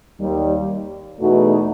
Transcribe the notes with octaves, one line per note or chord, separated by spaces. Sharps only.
D#2 D#3 G3
E2 B2 A3 D#4 F#4